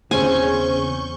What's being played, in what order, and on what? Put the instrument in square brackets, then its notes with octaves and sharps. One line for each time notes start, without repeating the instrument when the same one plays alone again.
[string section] E2 C#6 G6 [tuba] C#3 [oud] C4 C#4 G#4 [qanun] G#5